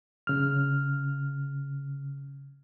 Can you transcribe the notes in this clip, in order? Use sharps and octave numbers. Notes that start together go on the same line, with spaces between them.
C#3 F6